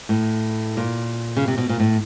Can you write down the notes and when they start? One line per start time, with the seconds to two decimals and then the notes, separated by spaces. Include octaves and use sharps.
0.09 A2
0.77 A#2
1.37 C#3
1.48 C3
1.58 B2
1.69 A#2
1.80 A2